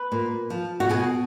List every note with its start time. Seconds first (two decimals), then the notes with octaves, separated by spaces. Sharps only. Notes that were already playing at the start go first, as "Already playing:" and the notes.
Already playing: B4
0.12 A#2
0.50 F3
0.80 F#4
0.89 B2 G#4